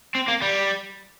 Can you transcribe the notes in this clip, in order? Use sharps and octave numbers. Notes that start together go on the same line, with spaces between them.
C4
A#3
G3